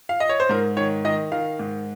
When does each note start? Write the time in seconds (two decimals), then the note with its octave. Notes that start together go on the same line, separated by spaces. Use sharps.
0.09 F5
0.20 D#5
0.29 C#5
0.40 C5
0.49 G#2 A#4
0.77 D#3 C#5
1.05 D#3 D#5
1.32 D#3 F5
1.59 G#2